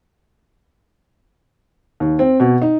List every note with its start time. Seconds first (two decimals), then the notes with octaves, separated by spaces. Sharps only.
2.00 D#2
2.19 C4
2.40 B2
2.62 D#4